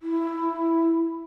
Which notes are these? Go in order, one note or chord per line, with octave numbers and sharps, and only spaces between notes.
E4